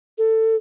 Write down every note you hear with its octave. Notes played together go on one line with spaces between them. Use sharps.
A4